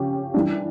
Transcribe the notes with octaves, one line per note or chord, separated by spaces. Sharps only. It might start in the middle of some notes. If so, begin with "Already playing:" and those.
Already playing: C#3 F3 C#4 G4 C#5
E3 G3 D4